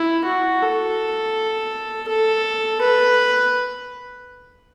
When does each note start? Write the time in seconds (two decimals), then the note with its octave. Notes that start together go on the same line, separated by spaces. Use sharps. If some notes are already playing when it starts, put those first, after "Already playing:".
Already playing: E4
0.25 F#4
0.62 A4
2.08 A4
2.81 B4